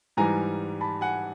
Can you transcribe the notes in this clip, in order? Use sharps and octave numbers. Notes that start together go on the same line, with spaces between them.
G#2 E3 G3 G#5 A#5
A5 B5
F#5 G#5